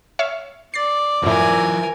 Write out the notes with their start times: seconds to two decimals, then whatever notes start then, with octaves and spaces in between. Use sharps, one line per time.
0.19 C#5 E5 F5
0.74 D5 A6 C7
1.23 F#2 A2 F3 E4 A#4 G#5